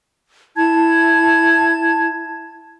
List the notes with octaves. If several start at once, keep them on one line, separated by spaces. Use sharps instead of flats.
E4 A5 G#6